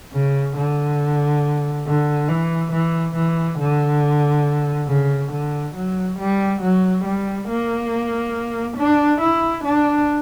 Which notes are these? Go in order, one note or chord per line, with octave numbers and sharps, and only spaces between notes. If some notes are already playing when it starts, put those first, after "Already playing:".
C#3
D3
D3
E3
E3
E3
D3
C#3
D3
F#3
G3
F#3
G3
A#3
D4
E4
D4